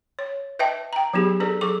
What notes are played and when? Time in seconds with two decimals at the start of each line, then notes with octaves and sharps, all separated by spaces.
0.19 C#5
0.59 B4 D#5 E5 G5 A5
0.93 G5 A#5
1.14 F#3 B3 D#4 G4 G#4
1.40 D4 G#4 A4 B4 D5
1.61 F#3 G#4 A4 C#6 D6